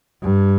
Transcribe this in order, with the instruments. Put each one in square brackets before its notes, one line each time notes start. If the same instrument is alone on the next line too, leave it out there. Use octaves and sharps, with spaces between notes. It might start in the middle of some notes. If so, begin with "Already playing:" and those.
[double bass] G2